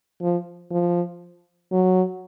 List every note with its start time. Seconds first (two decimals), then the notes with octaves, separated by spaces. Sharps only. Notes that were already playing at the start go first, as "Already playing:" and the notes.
0.22 F3
0.72 F3
1.72 F#3